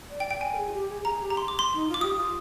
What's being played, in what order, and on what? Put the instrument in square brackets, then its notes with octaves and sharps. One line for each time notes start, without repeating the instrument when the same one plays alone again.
[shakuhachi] D5
[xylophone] G5
G5
G#5
[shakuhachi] A#4
G#4
F4
G4
G#4
[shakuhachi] G#4 [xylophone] A#5
[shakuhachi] G4
[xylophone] A#5
C6
D6
C6
[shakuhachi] D#4
F4
[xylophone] D6
[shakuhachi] G4 [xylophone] D#6
[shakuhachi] F4